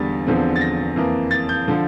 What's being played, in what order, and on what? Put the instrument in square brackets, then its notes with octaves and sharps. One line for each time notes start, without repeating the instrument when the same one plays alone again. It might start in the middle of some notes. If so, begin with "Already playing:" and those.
Already playing: [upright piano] E2 D3 G3 A6
E2 D3 F3 C4
A6
A#6
F2 E3 A#3
A6
G6
D3 F3